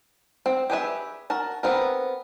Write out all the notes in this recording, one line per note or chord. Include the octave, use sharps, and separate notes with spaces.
C4
G4 G#4 B4 E5
F#4 A#4 A5
B3 C4 A#4